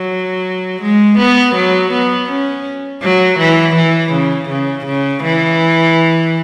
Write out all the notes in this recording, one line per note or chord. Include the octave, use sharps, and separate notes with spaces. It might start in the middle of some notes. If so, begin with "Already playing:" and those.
Already playing: F#3
G#3
B3
F#3
B3
C#4
F#3
E3
E3
C#3
C#3
C#3
E3